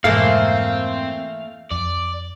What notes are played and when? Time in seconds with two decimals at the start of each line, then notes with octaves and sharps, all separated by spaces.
0.04 F2 G#2 B2 E3 A3 A#3 C4 F5
1.71 F2 D5